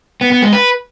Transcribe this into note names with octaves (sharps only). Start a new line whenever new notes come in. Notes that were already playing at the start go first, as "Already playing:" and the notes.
B3
B3
G#3
B4